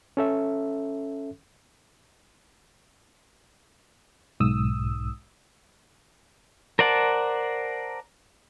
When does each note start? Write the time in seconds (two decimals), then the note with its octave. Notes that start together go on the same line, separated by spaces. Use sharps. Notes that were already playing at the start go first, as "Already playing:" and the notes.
0.17 C#4 A4 E5
4.40 B1 G#2 D#6 E6
6.79 A#4 C5 D5 F#5 A5